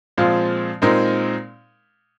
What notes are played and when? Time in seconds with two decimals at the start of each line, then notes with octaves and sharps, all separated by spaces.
0.17 A#2 F3 G#3 C4 F4
0.82 A#2 G#3 C4 D#4 A#4